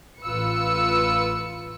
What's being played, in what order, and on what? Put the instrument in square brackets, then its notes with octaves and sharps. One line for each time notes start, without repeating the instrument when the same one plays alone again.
[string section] A1 F4 B4 E6 C#7